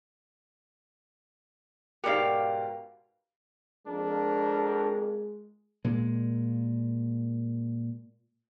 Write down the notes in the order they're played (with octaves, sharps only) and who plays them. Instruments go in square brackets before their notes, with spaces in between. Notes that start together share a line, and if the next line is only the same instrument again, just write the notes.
[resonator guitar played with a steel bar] G#2 B2 G4 [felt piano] A#4 D5 [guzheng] F5 F#5
[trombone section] F2 A#4 [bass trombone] G#3 [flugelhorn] D4
[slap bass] A#2 G#3